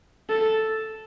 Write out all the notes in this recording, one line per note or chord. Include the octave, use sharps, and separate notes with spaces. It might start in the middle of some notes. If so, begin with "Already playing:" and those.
A4